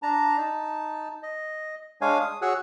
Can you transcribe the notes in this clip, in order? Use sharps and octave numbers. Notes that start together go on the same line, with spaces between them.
D4 A5 A#5
D#4 A5
D#5
G#3 D4 C#5 F5 G#5
D#6
F#4 G#4 C#5 F#5 E6 F#6